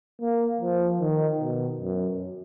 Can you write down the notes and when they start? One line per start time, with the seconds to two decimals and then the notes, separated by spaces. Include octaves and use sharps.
0.21 A#3
0.61 F3
1.01 D#3
1.40 B2
1.80 F#2